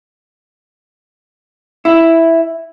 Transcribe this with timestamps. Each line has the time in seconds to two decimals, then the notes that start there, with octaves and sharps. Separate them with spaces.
1.85 E4